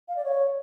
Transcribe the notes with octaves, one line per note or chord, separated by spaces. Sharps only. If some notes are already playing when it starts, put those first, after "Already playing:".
F5
D5
C#5